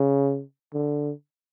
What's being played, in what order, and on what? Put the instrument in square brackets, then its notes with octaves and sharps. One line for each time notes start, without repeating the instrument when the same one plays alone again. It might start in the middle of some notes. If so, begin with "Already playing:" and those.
Already playing: [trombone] C#3
D3